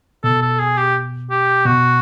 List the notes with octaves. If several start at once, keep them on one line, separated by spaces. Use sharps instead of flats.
B2 A4
A4
G#4
G4
G4
B2 F#4